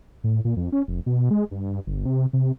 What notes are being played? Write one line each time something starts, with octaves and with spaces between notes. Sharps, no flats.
A2
A#2
F2
C#4
F1
B2
G#3
G2
G1
C3
C3